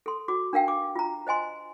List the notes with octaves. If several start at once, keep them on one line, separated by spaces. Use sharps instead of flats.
A4 C6
F#4 D6
D4 A#4 F5 G5
D6
F4 A#5
C5 D#5 G#5 C6